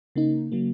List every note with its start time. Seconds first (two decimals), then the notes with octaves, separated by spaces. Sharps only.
0.16 C#3 A#3 D#4
0.52 C#3 F#3 A#3